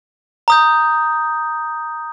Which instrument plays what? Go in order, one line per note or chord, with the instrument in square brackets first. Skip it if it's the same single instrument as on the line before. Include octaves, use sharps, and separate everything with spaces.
[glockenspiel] A#5 D#6 G6